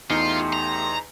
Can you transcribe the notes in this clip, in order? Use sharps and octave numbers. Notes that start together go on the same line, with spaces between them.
E2 A3 D#4 F4 G4 C6 C#7
A#5